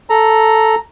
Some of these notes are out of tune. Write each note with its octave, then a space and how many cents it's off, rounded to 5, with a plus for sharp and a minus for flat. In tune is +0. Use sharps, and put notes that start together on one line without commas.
A4 +0 A#5 +0